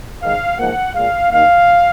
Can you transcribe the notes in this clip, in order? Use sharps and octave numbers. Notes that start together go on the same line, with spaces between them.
G#2 D#3 G#3 F5
G#2 F3 A#3 F#5
A#2 G#3 F5
D#2 D#3 A#3 F5